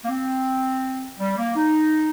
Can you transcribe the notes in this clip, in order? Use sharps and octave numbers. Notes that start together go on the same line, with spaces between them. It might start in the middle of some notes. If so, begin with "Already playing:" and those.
A#3
C4
G3
A#3
D#4